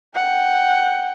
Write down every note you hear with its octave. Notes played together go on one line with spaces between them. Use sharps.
F#5 G5